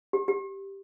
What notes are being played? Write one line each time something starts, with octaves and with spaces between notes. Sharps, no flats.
G4
G4